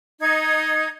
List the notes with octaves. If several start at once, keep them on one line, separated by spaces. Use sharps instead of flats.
D#4 G#6